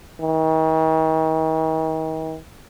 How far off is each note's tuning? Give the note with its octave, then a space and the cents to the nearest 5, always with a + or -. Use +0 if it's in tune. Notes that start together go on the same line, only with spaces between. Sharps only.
D#3 +40